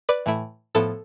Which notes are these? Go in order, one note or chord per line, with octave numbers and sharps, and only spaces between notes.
B4 D5
A2 E3 A3 E4
A2 F3 B3 E4 A4